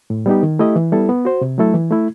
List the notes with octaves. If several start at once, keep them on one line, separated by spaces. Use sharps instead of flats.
A2
G3 B3 D#4 G4
D#3
A3 E4 G4 D#5
E3
G3 B3 E4 A4
B3
F#4 C5
C3
F#3 A3 E4 A4
E3
A3 E4